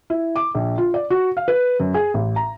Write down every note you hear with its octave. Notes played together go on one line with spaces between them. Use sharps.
E4
D6
A#1
F4
D5
F#4
F5
B4
F#2
G#4
A1
A#5